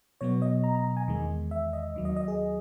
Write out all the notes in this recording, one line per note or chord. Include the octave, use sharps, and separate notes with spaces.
B2 F#3 B3 C#5
D#5
A#5
A#5
G#5
E2 D#3 G#3
E5
D#5
D#2 D#3 F#3
D#5
D#5
G#4